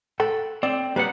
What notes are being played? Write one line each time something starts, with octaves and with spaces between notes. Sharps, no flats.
A4 F#5 G5
C4 D5
G3 A#3 B4 F#5